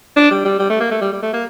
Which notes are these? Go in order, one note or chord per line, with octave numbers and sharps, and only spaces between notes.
D4
G3
G3
G3
A3
A#3
A3
G3
G3
A3
A#3